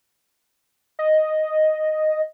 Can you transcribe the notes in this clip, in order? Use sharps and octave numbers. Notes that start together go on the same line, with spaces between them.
D#5